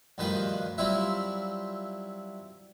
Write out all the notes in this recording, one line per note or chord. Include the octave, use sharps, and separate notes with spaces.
D2 G2 D#3 F3 B4 C5
F#3 G3 C4 E4 F4 E5